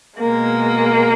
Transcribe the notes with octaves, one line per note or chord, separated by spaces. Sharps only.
B2 G#3 A#3